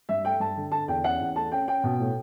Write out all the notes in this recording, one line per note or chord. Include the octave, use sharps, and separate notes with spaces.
G2 E5
A3 G5
G2 A5
D3
D3 A5
E2 G5
C#4 F#5
E2
A3 A5
C#4 G5
C#4 G5
B2
A2